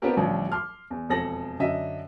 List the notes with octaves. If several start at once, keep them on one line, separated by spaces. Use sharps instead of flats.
B3 C4 D4 F4 G4 A#4
A1 D3 F3 G3
C6 D6 F6
E2
E1 F2 A4 A#6 F#7
F#2 D3 D#5 E5